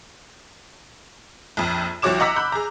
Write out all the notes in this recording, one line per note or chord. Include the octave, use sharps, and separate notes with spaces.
A#1 F2
C2 F3 F#4 C#5 D6 E7
D#5 F#5 A#5 D6 E6 B6
B5 F#6 G6
G#4 A#5